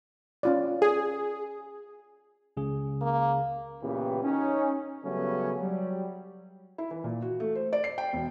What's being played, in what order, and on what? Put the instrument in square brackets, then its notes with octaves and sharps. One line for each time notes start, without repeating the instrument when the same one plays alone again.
[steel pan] C#4 F4 D5
[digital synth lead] G#4
[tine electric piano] C#2 C#3 G#4
[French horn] A#3
[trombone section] A#2 C#3 E3 B3 G4
C#4 D#4
C#3 F#3 G3 A3 B3 C#4
F#3 G3
[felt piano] E4
E3
A#2
F#4
A3
C5
D5
C7
G5
E1